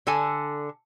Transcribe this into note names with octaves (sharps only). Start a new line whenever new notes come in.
D3 A4 G#5